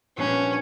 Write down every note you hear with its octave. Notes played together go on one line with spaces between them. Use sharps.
A#2 G3 B3 C#4 D4